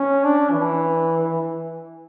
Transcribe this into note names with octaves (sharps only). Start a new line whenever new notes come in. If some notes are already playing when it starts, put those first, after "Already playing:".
Already playing: C#4
D4
E3